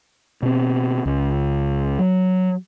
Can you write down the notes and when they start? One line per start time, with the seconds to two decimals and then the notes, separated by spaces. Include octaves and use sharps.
0.43 B2 C4
1.06 C#2
1.99 F#3